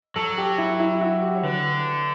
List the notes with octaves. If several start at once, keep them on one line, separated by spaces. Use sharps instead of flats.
F#3 A4
G4
E4
E4
F#4
G4
C#5
D3 B4